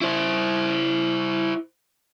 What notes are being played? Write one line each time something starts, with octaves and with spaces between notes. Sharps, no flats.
E4 C5